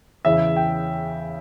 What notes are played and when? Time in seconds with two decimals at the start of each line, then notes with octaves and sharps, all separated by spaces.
0.25 E2 C#3 E3 E5
0.56 G5